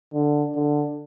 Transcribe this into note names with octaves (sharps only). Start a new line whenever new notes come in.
D3
D3